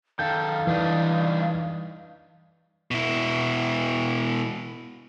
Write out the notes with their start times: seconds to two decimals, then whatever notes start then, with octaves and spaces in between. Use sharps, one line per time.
0.19 D#3 A4 F5 G6
0.67 G2 E3 D4 D#4
2.91 B2 E4